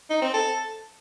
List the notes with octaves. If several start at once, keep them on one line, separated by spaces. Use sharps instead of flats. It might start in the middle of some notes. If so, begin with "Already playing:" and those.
D#4
C4
A4